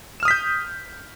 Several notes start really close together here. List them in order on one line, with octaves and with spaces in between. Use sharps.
E7 F6 D#6 B6 G6